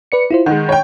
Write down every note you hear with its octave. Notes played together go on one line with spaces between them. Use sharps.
B4 D5 C#7
E4 F4 C5
D#3 G#3 F#5
C#5 G5